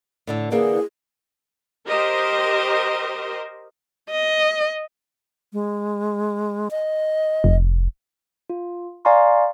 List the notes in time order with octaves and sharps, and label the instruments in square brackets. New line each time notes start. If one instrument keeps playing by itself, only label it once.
[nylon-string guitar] A2 D3 A4
[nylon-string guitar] D3 E3 A#3 [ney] G#4
[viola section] G4 A#4 C5 D#5
[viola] D#5
[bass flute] G#3
D#5
[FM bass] F1
[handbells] F4
D5 F5 G#5 A#5 C6 C#6